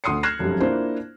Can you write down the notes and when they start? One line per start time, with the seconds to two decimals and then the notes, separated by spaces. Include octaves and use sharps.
0.04 D2 C6 D#6 C7 C#7
0.23 F6 F#6 G#6 A#6 C7 E7
0.39 F1 F#2 G3
0.60 A#3 D4 E4 F4 C5